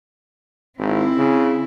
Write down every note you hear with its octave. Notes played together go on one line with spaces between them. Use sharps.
G#1 C4 E4
C#3